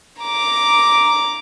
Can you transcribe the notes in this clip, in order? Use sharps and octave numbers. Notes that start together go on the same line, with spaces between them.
A#5 D6